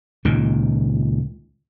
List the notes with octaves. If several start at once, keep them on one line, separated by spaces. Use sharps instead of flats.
C#2 A#2 D#3